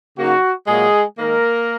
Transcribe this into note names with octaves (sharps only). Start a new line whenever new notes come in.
C#3 F#3 A#3 D#4 F#4
A#2 F#3 G#3 A#3 G#4
D#3 G#3 A#3 D#4 A#4